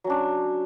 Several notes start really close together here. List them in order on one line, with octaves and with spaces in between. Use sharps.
F#3 C#4 D4